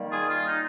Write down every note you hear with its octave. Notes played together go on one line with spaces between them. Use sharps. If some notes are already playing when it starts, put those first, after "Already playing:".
Already playing: D#3 G3 A#3
F4 G#4
F4
D#4